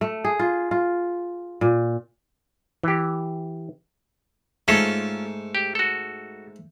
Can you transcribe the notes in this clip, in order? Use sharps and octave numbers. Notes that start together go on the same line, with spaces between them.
A3
G#4
F4
F4
A#2
E3 G4
G#2 A3 C#4 F4 A4
G4
F#4 A4